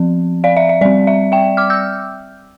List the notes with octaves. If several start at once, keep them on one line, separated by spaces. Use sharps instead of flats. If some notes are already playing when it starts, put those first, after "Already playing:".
Already playing: F3 C4
D5 F5
E5
E5
G3 C4 D5
E5
E5 G5
D6 F6
E6 G6